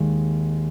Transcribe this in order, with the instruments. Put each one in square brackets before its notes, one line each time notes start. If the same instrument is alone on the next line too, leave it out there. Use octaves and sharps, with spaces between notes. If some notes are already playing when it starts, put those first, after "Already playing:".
Already playing: [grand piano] D#2 G#3